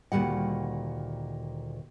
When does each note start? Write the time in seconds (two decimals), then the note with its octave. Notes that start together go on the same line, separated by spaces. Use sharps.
0.12 D2 A#2 D#3 G3 F#5